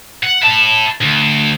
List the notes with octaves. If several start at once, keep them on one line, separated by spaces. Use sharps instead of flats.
F#5
E4 A5
D2